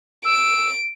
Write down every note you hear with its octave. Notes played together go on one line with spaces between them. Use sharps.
E6 D7